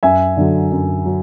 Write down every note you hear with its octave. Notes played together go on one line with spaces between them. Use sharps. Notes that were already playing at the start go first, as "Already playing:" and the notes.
F#2 E5 G#5
D3 F#3
F#2
F#3